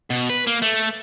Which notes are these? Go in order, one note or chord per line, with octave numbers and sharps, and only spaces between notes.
B2
B4
A#3
A3